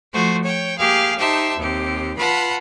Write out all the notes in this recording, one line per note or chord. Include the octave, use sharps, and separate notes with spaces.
F3 A3 F#4 C5
C#5 G5
A#3 G4 G#4 F5
D#4 G4 C5 E5 A5
D#2 C4 G4
F4 B4 F#5 A5 B5